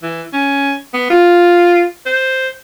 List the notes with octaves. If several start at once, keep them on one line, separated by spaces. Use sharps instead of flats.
E3
C#4
B3
F4
C5